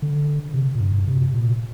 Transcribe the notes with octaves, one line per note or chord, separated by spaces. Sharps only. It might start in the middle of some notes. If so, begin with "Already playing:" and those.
D3
C3
A#2
G2
G2
C3
A#2